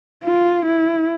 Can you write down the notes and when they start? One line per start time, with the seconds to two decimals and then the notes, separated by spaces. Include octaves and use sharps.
0.24 F4
0.66 E4